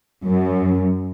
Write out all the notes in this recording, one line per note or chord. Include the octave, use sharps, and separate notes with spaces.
F#2